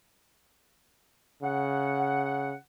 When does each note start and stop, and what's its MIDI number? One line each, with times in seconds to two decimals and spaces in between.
1.43 2.55 49
1.43 2.56 78